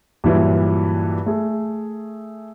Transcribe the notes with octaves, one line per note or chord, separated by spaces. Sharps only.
G2 A#2 E3 F#3
A3 G#4